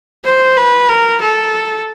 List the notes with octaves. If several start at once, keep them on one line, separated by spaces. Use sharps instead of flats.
C5
B4
A#4
A4